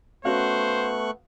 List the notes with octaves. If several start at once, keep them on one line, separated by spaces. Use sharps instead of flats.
A3 B3 C#4 F#4 C5 F5 C#6 F#6